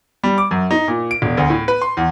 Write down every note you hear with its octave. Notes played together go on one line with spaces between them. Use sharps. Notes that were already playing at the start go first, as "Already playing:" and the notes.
G3
D6
F#2
D#4
A#2
D7
E1
D2
A2
B4
C6
E2